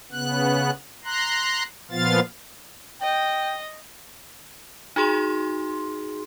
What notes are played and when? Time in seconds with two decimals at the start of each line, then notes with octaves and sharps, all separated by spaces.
0.12 C#3 B3 F#6
1.05 A#5 C6 F#6
1.91 A#2 F3 B3 F4 F5 A6
3.02 D#5 G5
4.96 D#4 F#4 G#4 C6